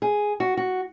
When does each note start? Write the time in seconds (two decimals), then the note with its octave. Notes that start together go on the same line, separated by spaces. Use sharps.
0.02 G#4
0.40 F#4
0.57 F#4